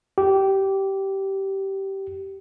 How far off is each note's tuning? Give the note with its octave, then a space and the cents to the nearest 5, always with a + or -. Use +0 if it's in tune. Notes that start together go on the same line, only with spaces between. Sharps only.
G4 -15